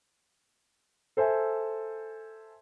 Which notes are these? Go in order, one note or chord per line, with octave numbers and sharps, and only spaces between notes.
A4 C5 E5 G#5